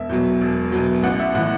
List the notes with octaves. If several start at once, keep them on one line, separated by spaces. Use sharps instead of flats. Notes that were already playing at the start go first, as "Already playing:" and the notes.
Already playing: E1 E5
E2 B2 F#3
E1
E2 B2 F#3
A1 F#5
E5
A2 E3 F#5